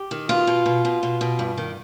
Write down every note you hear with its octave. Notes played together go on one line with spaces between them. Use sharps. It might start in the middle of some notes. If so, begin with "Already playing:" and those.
Already playing: G4
D#3
B2 F4
B2
B2
B2
B2
B2
G2
D#3